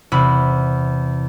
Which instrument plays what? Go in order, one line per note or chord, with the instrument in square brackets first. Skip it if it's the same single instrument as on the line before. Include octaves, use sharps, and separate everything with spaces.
[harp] E2 C3 B5